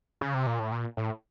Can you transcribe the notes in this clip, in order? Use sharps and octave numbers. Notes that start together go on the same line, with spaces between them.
C#3
C3
A#2
A2
A#2
A2